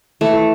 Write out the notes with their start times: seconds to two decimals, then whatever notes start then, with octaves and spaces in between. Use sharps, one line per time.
0.21 E3 A3
0.33 E3